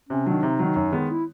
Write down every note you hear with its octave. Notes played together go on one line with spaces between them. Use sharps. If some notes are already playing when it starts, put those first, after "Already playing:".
C3 C#4
D#3 F#3 D4
C3 D#4
D#3 F#3
F#2
D#3 G#3 B3
E4